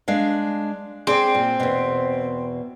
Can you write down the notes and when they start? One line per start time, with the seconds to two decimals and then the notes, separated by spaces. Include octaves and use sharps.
0.08 G#3 D4 F5
1.07 C4 G#4 D5
1.35 A#2
1.60 E2 B2